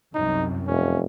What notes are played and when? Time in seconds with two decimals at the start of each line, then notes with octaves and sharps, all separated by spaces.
0.15 C2 F#2 D#4
0.67 F1 C#4